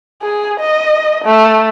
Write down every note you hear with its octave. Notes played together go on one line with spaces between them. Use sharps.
G#4
D#5
A3